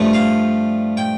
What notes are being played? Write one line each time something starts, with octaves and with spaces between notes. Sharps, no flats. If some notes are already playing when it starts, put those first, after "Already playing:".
Already playing: G2 F3 A3
F5
G5